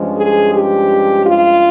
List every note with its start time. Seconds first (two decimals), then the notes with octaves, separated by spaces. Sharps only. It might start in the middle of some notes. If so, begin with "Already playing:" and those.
Already playing: G2 F3 G#3 C#4
0.18 G#4
0.53 G4
1.24 F4